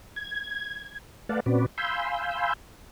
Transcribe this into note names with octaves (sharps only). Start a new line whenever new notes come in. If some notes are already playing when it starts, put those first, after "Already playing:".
G#6
A3 B4 D5 F5 F#5 A5
A#2 C4 C#4 F#4 B4 D5
F5 G#5 B5 C6 E6 G6